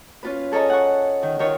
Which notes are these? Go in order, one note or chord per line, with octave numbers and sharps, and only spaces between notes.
C#4 F4 B4
G#4 A4 C#5 D#5 A#5
F#5 C#6
D#3
D#3 D#4 F4 A#4 C#5